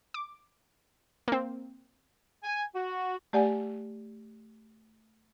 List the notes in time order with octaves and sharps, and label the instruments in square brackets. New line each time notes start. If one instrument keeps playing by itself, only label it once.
[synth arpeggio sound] D6
A#3 C4
[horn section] G#5
F#4
[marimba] A3 G4 D5 F#5 G#5